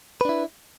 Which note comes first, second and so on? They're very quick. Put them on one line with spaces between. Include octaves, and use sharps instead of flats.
B4 D4 E4